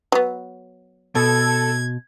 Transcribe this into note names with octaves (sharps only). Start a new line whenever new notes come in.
F#3 B3
B2 A4 G#6